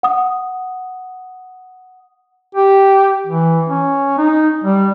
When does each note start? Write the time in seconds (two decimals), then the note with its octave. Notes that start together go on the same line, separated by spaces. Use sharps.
0.03 F#5 D#6
2.55 G4
3.27 E3
3.69 C#4
4.18 D#4
4.64 G3